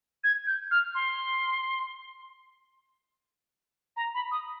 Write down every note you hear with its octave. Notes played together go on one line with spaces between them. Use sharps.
G#6
G6
F6
C6
A#5
B5
D#6